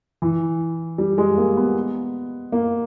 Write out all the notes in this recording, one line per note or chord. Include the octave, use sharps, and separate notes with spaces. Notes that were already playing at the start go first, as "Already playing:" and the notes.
E3
G3
G#3
A#3
B3
A#3